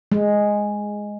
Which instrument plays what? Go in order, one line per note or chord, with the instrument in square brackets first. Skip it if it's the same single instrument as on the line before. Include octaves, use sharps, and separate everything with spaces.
[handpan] G#3